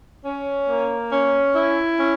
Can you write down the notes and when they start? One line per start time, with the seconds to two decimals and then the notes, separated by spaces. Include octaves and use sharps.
0.25 C#4
0.68 A#3
1.11 C#4
1.55 E4
1.99 C#4